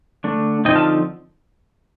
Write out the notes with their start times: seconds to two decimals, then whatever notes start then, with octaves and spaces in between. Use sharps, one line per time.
0.24 D3 A3 D4
0.65 D3 F3 C4 D#4 D#5 G5
0.76 F5 A5